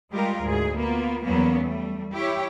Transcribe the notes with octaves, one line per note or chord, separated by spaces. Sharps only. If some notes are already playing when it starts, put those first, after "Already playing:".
G3 G#3 F4 G4 A#4
D2 G#2 G#4
A#3 B3 F4
E2 F#3 G3 A#3 B3 C#4
G3 A3
E4 G4 C#5